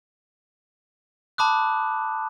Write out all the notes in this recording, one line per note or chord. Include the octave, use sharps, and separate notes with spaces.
A5 B5 D6 D#6 F#6